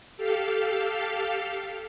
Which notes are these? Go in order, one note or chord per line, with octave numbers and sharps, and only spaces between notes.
G4 A4 F5